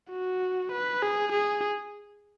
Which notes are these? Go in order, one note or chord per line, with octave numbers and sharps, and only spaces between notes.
F#4
B4
G#4
G#4